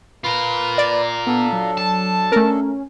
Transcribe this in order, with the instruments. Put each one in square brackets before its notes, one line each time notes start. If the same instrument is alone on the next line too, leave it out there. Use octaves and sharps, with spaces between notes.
[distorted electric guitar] F4 A#4 [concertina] B4 B5 C6
[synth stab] D5
[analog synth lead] B3 [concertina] D4 A4
[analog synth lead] F#3
[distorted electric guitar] A5
[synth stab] A3 A#4 [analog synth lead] C#4